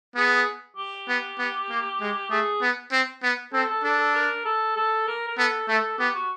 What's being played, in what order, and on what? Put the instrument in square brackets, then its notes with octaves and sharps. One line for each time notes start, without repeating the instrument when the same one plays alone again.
[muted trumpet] B3 [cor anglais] G#4
[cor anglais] G4
[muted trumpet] B3
B3
A#3
G#3
[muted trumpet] A3 [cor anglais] G#4
[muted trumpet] B3
C4
B3
[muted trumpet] C4 [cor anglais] A4
[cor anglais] A4
[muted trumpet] D4 [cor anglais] A4
[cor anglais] A4
A#4
A4
A4
A#4
A#4
[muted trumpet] B3 [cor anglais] A4
[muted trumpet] A3 [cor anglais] A4
[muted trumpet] B3 [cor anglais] G4
[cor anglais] F#4